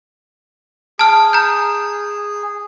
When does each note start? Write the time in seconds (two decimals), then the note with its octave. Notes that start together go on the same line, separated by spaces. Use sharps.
0.99 G#4 A5 F6
1.33 A#5 G6